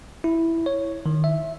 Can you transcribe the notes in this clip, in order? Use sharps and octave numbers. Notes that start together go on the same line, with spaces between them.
E4
C#5
D#3
E5